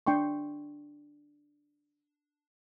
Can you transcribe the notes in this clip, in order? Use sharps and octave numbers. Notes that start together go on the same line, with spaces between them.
D4 G5 C6 C#6